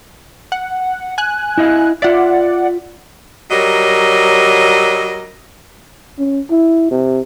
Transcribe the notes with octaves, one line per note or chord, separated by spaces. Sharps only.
F#5
G#5 F#6
E4 D#5 F5
F4 D5 E5 F#5
F#3 G3 A#4 C#5 D#5
C#4
E4
C3